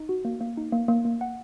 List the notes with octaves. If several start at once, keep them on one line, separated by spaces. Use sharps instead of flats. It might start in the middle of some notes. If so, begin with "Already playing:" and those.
Already playing: D#4
F#4
A#3
A#3
D#4
A#3
A#3
A#3
F#5